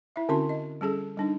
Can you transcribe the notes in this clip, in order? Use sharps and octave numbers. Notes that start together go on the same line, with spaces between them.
E4 E5
D3 C4 C#4 E4 F#4 C6
D#5
G3 C#4 G#4 A4
G3 D4 D#4